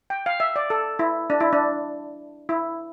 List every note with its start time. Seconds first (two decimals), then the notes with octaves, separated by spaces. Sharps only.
0.10 G5
0.26 F5
0.40 E5
0.56 D5
0.70 A4
0.99 E4
1.30 D4
1.40 E4
1.53 D4
2.49 E4